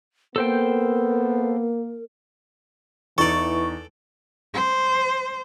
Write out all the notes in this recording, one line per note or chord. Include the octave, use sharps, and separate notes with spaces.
A#3 B3 A4 A#4 C5 G5
E2 E3 D#4 A4 D5 C#6
C5